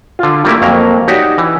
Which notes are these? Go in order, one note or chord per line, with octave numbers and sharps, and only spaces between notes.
D3 F4
G3 A3 A#3 E4 G4
F2 F#3 A#3 A#5
D#4 F#4 G4 C#5 D5
E3